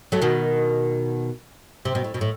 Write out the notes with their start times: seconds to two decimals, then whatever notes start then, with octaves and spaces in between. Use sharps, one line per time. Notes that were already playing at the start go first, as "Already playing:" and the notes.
0.12 F#3 A3
0.22 B2 D#3
1.85 C3
1.95 B2
2.04 A2
2.14 B2
2.21 A2